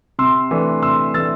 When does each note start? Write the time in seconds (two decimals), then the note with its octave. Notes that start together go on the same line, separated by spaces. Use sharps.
0.19 C3 C6 E6
0.51 E3 A3 D4
0.82 C3 C6 E6
1.14 E3 A3 D4 E6 A6